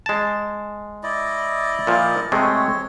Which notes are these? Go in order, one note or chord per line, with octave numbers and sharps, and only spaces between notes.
G#3 A5
E4 D5 D#5
A#2 F3
C3 G#3 A3 C4 C#5